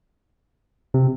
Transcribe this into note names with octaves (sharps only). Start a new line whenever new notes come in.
C3